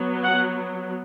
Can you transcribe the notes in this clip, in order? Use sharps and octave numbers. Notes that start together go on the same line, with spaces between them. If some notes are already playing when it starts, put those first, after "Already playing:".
Already playing: F#3 B3
F#5